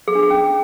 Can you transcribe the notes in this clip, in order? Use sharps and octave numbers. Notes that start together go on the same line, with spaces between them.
G#4
D4
G#4
C#4